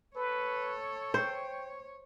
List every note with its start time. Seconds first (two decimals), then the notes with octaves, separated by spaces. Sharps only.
0.16 A4 B4 C#5
1.14 C5 G5